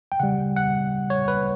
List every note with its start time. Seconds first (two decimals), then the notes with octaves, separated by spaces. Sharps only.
0.12 G5
0.20 C#3 G3 F#5
0.56 F#5
1.10 C#5
1.28 B4